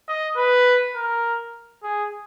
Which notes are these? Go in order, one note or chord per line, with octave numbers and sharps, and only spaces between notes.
D#5
B4
A#4
G#4